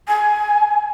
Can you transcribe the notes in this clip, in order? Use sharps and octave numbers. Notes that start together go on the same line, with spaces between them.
G#5